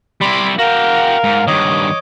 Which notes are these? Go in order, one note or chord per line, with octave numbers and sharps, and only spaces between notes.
G3 E4 B5 C6 D6
F#4 A#4 F5 G5
G#2
G2 D#3 C#5 D#5 D6